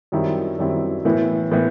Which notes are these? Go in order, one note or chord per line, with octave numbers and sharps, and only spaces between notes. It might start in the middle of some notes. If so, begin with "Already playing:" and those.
F#2 D#3 G3 C4 E4
F#2 D#3 G3 C4 E4
A2 E3 B3 E4
A2 E3 B3 E4